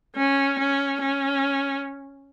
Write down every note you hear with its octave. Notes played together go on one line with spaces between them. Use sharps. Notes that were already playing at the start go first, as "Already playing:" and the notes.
C#4
C#4
C#4